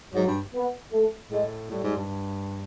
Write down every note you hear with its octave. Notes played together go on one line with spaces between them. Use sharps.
G#2 F#3
G2
B3
A3
A2 G#3
A2 G3
G#2
G2